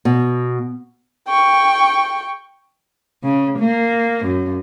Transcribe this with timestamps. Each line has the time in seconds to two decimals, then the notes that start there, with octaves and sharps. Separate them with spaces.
0.05 B2
1.28 G5 C#6
3.24 C#3
3.59 A#3
4.26 F#2